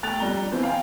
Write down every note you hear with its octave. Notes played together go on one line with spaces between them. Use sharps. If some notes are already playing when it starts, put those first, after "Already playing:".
A3 G5 F#6 A6 F7
F2 G3 A#5 G7
D4
E3 B3 C4
F5 G5 G#5